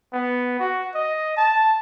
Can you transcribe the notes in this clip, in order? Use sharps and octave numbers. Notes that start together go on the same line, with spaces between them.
B3
F#4
D#5
A5